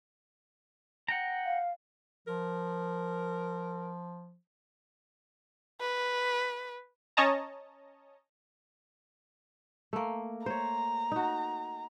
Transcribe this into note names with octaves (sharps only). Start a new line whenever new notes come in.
F#5 G5 A#5
F5
F3 A#4
B4
C#4 C#5 D#5 A5 A#5
A3 A#3
C5 C#5 A#5
D#4 F#4